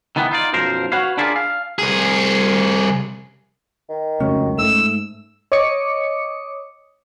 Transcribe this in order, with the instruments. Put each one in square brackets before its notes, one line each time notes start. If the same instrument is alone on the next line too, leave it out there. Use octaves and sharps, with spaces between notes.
[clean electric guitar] D#3 E3 B3
D#4 F4 D5
B1 F#2 F3 A#4 C5
F#4 B4 C#5 F5
D4 E4 F4 G#4 A#4 D5
F5
[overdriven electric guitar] C2 G#4
[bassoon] D#3
[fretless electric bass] F1 C#2 F#2 [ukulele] C#4
[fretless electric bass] G#2 A3 [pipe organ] E6
[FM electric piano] C#5 D#5 D6 D#6 C#7